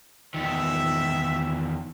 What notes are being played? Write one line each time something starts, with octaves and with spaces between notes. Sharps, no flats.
E2 D#3 E5